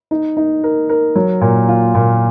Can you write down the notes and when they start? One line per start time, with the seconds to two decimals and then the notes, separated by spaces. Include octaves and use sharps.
0.11 D#4
0.37 D#4
0.64 A#4
0.89 A#4
1.16 F#3
1.41 A#2
1.68 F4
1.95 A#2